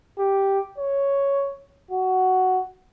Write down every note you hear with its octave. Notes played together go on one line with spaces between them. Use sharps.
G4
C#5
F#4